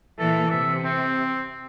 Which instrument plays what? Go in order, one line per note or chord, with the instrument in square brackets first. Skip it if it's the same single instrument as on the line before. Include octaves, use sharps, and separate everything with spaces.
[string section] A#2 E3 [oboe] A4
[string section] C3 [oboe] E5
[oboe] C4